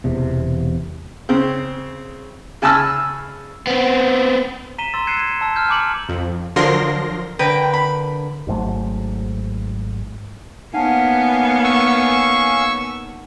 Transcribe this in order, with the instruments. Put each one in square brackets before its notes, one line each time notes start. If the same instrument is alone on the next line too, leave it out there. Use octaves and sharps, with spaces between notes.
[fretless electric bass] E1 E2 C3
[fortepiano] C#3 C4
C#3 G#5 A5 B5 E6 F6
[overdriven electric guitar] B3 C4
[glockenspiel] A#5 B6 D#7 E7 G7
C6 E6 A6
F#6 G#6 C7 C#7 D#7 E7
A5 E6
F6 G6
G#5 A#5 D6 C#7 F#7
[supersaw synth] F2
D3 F3 F#3 A#4 C6 A#6
[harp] D3 A#4 B4 [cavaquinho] G5
[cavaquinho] B5
[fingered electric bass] G#1 G#2 F#3 A3
[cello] A#3 B3 [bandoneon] C#4 F5 G#5 [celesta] D#4 F#5 A5
[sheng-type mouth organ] C#6 E6